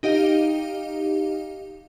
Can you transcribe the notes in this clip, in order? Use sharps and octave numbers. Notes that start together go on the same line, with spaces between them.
D#4 G4 D#5 F5